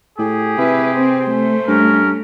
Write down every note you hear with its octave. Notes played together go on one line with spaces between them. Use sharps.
A2 G4 G#4
C3 E4 B4
C4 C5
A3
G2 C#4 A#4